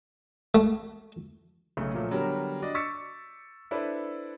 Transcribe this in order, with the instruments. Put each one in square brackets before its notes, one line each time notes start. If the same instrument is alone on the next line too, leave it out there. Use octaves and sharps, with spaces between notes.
[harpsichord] A3
[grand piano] B1 C#3 A3
A#2 F3 F#3 A3
D3 F#3 G3 B3 F#4 A#4
D4 F#4 D5 D#5
C#6 D6 E6 A6 B6 C#7
D4 E4 A4 B4 C5 D5